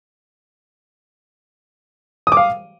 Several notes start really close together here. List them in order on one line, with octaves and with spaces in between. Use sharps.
D#6 D6 F5